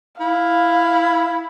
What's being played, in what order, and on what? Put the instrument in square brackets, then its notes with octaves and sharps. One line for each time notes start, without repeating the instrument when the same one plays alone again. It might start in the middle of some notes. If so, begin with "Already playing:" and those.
[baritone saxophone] E4 [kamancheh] F5